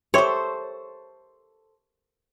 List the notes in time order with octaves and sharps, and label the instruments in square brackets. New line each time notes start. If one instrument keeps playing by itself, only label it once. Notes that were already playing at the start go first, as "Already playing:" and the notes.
[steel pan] G4 E5 [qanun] A4 C5 [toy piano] A#4 C6 C#6 [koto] C#5